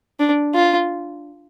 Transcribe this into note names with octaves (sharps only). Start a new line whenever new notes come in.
D4
F4